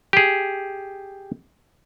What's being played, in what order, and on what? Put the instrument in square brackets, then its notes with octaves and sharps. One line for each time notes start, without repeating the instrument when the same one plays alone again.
[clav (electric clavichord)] G4 G#4